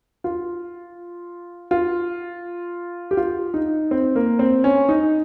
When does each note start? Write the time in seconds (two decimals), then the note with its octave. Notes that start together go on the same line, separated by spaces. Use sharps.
0.24 F4
1.71 F4
3.11 G4
3.17 F4
3.54 D#4
3.91 C4
4.16 A#3
4.39 C4
4.64 C#4
4.89 D#4